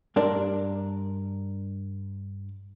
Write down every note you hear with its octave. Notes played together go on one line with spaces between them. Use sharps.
G2 D4 A#4 D5 C6